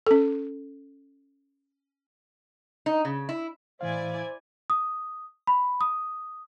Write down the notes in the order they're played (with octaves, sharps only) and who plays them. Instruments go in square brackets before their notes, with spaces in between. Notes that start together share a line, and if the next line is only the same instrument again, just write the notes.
[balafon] C#4 A4
[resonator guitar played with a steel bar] D#4
C#3
E4
[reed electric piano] A2 E3 F5 [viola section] E4 D5 G#5 [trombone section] C5
[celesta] D#6
B5
D#6